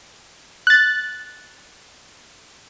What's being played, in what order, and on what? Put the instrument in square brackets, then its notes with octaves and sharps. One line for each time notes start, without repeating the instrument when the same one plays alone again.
[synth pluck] F#6 A6